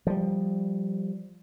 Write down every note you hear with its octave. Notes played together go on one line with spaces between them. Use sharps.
F3 G3